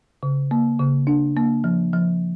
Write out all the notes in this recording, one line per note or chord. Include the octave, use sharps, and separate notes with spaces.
C#3
A#3
C#3
D4
A#3
F3
F3